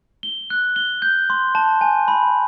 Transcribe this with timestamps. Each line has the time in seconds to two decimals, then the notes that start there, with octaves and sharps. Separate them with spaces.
0.23 G7
0.50 F#6
0.76 G7
1.02 G6
1.30 C6
1.55 A5
1.81 G#5
2.08 B5